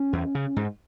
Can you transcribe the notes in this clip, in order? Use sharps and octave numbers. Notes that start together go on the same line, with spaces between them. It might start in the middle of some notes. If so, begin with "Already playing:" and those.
Already playing: C#4
E2
C#3
G#2